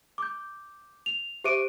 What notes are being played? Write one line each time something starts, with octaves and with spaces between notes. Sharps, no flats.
D6 G6
F7
G4 C5 E5 D6 D7 D#7